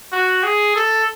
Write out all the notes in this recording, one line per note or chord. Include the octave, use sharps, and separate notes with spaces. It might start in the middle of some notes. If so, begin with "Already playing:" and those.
F#4
G#4
A4